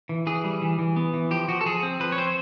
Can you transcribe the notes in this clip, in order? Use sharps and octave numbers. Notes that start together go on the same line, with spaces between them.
E3
E3 G#4
G3
E3
E3
B3
E3
F3 G4
F3 F#4
A4
F3 G#4
C4
F3 B4
C#5
C4 C5